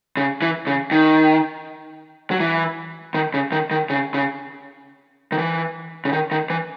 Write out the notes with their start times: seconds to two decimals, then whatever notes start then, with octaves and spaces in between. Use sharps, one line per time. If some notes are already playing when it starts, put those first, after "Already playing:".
0.17 C#3
0.42 E3
0.67 C#3
0.91 D#3
2.31 F#3
2.40 E3
3.14 D#3
3.34 C#3
3.52 D#3
3.71 D#3
3.90 C#3
4.14 C#3
5.32 D#3
5.38 E3
6.05 C#3
6.13 D#3
6.31 D#3
6.50 E3